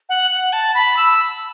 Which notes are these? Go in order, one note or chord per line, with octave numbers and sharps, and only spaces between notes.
F#5
F#5
A5
B5
E6